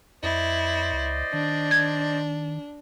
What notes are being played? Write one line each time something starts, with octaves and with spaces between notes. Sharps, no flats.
F2 E4 C5 D5 D#5
C#2
D#3 D4
G#6